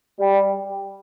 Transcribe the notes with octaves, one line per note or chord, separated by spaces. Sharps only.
G3